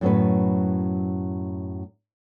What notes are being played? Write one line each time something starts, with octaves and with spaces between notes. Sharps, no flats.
F#2 A2 F#3 B3 C#4 B4